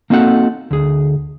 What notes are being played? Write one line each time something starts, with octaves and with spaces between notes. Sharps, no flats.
A#3 C4 D#4 F#4 A4 F#5
D2 G#4